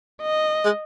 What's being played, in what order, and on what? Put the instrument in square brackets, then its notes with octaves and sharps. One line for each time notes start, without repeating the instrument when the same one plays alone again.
[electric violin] D#5
[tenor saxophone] G#3